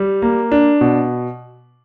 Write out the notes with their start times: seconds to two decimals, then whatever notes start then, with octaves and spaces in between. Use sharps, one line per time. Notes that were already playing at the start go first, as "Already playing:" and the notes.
Already playing: G3
0.22 A#3
0.52 D4
0.81 B2